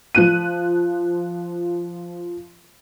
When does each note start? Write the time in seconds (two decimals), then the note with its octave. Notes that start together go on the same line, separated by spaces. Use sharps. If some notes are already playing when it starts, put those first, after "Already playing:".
0.15 F3 F#6 D#7